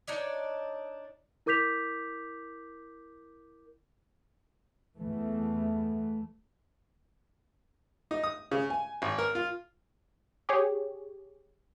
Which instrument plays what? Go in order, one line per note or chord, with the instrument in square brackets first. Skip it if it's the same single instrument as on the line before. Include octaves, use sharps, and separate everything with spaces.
[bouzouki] D4 D#4 C#5 D5
[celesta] E4 A#4 D6 G6 B6 F7
[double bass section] E2 E3 A3
[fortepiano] D#4
D#6
C#3
G#5
G#1
A#4
F4
[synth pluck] G4 G#4 C#5